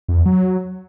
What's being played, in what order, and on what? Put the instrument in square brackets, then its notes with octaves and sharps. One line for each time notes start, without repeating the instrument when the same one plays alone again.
[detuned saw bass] F2
E2
F#3